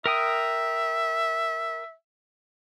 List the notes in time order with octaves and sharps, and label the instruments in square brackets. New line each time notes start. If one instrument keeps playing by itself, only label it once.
[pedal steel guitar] A#4 G5 D#6 [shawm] E5